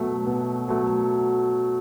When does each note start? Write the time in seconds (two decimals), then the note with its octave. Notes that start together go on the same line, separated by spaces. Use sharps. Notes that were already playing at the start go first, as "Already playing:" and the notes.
Already playing: B2 F#3 A3
0.26 B2
0.68 F#3 A3